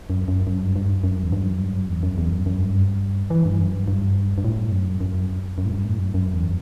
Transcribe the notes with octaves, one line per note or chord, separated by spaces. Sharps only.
F#2
F#2
F#2
G2
G2
F#2
E2
G2
F#2
G2
F#2
E2
F#2
E2
F#2
F#2
G2
E3
G2
F#2
G2
G2
G2
A2
F#2
F#2
F#2
A2
G2
A2
F#2
F#2
E2